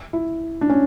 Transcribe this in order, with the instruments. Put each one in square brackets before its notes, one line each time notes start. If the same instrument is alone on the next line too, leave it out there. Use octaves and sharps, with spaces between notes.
[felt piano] E4
D4
C#4